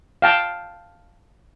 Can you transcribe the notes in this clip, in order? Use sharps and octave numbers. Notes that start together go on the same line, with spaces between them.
F5 G5 A5